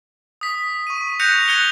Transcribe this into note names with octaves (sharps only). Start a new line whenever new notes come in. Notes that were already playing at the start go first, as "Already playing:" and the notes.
D#6 B6
C#6 D#7
F#6 G6 A#6 C#7 F7
F#6 G#6 A#6 C#7 F7 G7